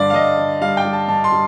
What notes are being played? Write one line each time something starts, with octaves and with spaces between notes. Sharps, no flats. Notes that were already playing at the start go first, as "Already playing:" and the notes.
Already playing: G2 D3 D5 F5
F5
G2 D#5
D3
G3 F5
G5
G3
A5
G2 A5
C6
G3